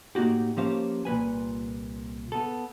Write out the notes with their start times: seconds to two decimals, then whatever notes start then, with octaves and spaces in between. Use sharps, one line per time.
0.15 A2 A#3 D#4 F#4 G4
0.57 F3 A#3 C#4 G4 C5 F5
1.05 C2 A#2 B4 G#5
2.32 B3 A4